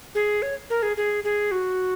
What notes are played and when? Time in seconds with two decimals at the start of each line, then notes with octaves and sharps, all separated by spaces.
0.15 G#4
0.42 C#5
0.70 A#4
0.83 G#4
0.97 G#4
1.24 G#4
1.51 F#4